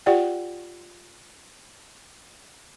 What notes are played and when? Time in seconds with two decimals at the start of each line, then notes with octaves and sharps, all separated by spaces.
0.06 F4 G4 D5 F#5 G5